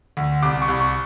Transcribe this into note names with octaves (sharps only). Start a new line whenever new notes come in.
D2
C2 D6
C#6
C2
C#6